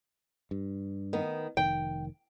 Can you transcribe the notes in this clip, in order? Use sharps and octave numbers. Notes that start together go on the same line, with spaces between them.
G2
D#3 B3
F1 D#3 G5